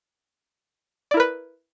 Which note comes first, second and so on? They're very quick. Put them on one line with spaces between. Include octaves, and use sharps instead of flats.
D5 E4 A#4 B4